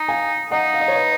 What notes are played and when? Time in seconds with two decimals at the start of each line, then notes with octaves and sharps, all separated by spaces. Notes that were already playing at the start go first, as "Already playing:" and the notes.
Already playing: D#4
0.08 F5 G#5
0.51 D#4 D#5 F#5
0.74 F5
0.81 D#5
0.88 C#5
0.95 B4 D#5